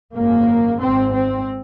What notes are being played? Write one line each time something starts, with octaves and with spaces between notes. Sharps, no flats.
G#1 F#2 C#3 A#3
G#1 G#2 C4
C4